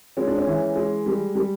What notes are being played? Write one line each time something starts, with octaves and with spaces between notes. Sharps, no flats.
G#3 C#4
D4
C#4
E3
G#3
G3
G3